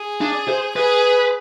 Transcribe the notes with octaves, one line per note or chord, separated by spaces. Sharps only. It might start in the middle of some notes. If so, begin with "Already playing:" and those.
Already playing: G#4
D4
C5
G#4 B4